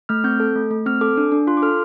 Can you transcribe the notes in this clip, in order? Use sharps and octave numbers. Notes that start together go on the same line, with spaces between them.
A3 F6
C4 G6
A4
A3
A3
C4 F6
A4 D6
D4
D4
F4 C6
D6
A4 F6